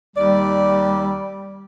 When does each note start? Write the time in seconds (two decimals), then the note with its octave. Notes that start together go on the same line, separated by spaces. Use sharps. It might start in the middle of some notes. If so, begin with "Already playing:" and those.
0.16 D#2 G3 D5